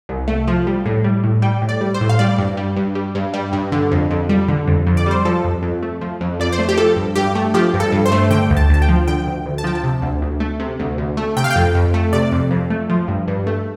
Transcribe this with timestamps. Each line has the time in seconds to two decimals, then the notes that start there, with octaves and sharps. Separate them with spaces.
0.09 C2
0.28 A3
0.48 F3
0.67 G3
0.86 A2
1.04 G3
1.24 A2
1.42 G3 G5
1.62 A2
1.69 D5
1.81 G3
1.94 C5
2.01 A2
2.09 F5
2.19 G3 D5
2.38 G2
2.57 G3
2.77 G2
2.95 G3
3.15 G2
3.34 G3
3.53 G2
3.72 D3
3.91 F2
4.11 F2
4.29 G3
4.48 D3
4.67 F2
4.86 F2
4.97 D5
5.06 G3 C5
5.25 F3 A4
5.44 F2
5.63 F2
5.83 A3
6.01 F3
6.21 F2
6.40 F2 D5
6.52 C5
6.59 A3
6.69 G4
6.77 F3 A4
6.96 G2
7.15 G2 G4
7.35 A3
7.54 F3 G4
7.74 G2
7.80 A4
7.92 G2
8.06 C5
8.12 A3
8.30 D3 G5
8.50 D2
8.57 A5
8.70 D2 A5
8.82 G5
8.89 F3
9.08 D3 G5
9.26 D2
9.46 D2
9.58 A5
9.64 F3 G5
9.75 A5
9.84 C3
10.02 D2
10.22 D2
10.40 A3
10.60 C3
10.79 D2
10.98 D2
11.17 A3
11.36 C3 G5
11.44 F5
11.50 G5
11.56 F2
11.75 F2
11.94 A3
12.13 C3 D5
12.32 F2
12.51 F2
12.70 A3
12.90 F3
13.08 G2
13.28 G2
13.47 A3